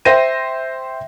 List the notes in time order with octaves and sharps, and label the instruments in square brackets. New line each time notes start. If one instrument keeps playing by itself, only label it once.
[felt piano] C5 E5 G5 A#6 D#7